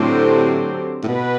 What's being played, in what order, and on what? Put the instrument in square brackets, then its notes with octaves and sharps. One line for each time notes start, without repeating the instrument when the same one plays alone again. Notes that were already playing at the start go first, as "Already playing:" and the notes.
Already playing: [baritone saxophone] A2 [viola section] D3 F#3 C4 G4 C5
[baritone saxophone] A2
[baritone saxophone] B2 [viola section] B4